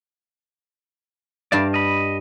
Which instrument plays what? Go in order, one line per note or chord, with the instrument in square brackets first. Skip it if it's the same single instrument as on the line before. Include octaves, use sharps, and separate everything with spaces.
[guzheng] G2 F5 A5 [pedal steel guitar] D5
[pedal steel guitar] D#5 B5